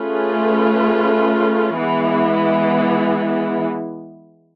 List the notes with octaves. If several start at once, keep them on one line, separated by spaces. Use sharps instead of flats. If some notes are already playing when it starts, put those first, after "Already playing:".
Already playing: A3 C#4 F4 G#4 B4
E3 G#3 B3